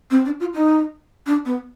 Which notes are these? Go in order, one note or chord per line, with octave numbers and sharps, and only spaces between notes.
C4
D4
F4
D#4
D4
B3